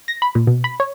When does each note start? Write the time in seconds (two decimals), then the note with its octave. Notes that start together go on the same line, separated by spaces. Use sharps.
0.08 A#6
0.22 B5
0.35 A#2
0.47 B2
0.64 B5
0.80 C#5